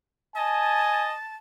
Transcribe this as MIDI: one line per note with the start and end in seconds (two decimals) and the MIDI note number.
0.36 1.15 75
0.36 1.08 80
0.36 1.37 81